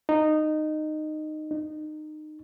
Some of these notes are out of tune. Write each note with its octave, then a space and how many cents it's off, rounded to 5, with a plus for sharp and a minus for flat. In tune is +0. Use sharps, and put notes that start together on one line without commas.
D#4 -15
D#4 -25